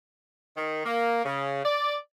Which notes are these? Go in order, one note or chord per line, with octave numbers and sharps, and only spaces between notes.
D#3
A#3
C#3
D5